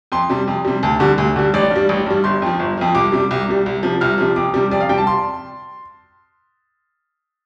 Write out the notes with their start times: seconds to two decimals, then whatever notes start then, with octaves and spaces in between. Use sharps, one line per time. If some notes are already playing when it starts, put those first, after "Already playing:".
0.12 F2 C6
0.30 C3 G3
0.48 F2
0.65 C3 G3
0.83 D2 A5
1.00 D3 G3
1.18 D2
1.36 D3 G3
1.54 A1 D5
1.71 G2 G3
1.89 A1
2.06 G2 G3
2.24 G1 C6
2.42 F2 F3
2.59 G1
2.77 F2 F3
2.95 C2 D6
3.12 C3 G3
3.31 C2
3.48 C3 G3
3.66 C2
3.83 C3 F3
4.01 C2 F6
4.18 C3 F3
4.36 F2 D6
4.54 C3 G3
4.71 F2 D5
4.81 F5
4.89 C3 G3 G5
4.98 A5
5.07 C6